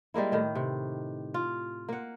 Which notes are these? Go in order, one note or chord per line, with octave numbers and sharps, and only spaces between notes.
G3 G#3 A#3 E4
A2 D#3
C3
F4
A#3 F#5